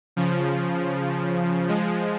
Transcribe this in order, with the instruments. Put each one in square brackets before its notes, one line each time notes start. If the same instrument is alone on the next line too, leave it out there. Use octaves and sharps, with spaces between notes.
[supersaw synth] C#3 F3
F3 G#3